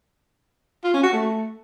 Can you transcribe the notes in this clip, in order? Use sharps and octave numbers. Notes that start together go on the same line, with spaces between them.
F4
C#4
F#4
A3